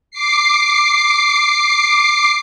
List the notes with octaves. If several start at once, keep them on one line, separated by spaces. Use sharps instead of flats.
D6 C7